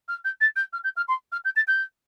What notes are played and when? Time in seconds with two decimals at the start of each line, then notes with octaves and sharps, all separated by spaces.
0.08 F6
0.25 G6
0.41 A6
0.56 G6
0.73 F6
0.84 G6
0.97 F6
1.08 C6
1.32 F6
1.45 G6
1.56 A6
1.68 G6